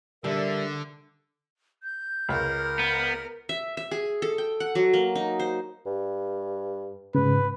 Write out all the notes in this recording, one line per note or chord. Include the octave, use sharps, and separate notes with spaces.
D3 G3 A#4 D5 E5
G6
C#2 A#4
B3
E5
E5
G#4
A4
G5
F#5
F#3
A#3
D#4
C5
G2
G#2 C#3 B4